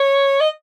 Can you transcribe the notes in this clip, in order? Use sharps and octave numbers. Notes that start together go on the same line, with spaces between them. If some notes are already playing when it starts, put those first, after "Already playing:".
Already playing: C#5
D#5